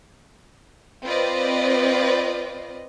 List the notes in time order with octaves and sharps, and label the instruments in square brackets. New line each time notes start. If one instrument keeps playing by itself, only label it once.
[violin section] C4 F4 B4 D5 D#5